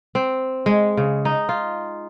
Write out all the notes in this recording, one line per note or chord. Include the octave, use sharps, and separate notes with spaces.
C4
G#3
C#3
D#4
F4